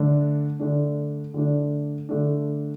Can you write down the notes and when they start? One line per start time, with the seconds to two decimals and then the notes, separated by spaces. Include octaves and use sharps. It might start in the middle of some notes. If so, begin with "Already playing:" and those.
Already playing: D3 A3 D4
0.59 D3 A3 D4
1.34 D3 A3 D4
2.09 D3 A3 D4